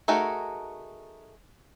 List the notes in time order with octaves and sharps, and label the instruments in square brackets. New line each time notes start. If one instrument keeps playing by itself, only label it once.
[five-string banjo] A3 D#4 F#4 G#4 A#4